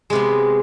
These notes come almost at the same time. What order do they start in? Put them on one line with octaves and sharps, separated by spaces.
G#3 C3 B3